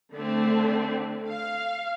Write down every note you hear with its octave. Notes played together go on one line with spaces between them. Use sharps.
D3 A3 C4
F5